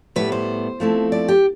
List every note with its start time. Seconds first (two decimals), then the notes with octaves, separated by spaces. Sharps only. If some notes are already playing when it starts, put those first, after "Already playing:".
0.16 A2 G3 B3 B4
0.32 C5
0.80 F3 A3 C4 E4
1.12 D5
1.28 G4